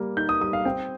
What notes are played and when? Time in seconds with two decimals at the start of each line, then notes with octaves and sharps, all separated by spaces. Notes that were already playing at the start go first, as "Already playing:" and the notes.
Already playing: G3 A#3
0.17 D#4 G6
0.29 D#6
0.41 G3 D#6
0.53 F5
0.65 C4 G5